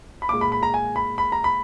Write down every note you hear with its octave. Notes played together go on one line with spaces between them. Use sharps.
B5
A#2 G#3 D6
B5
B5
A#5
G#5
B5
B5
A#5
B5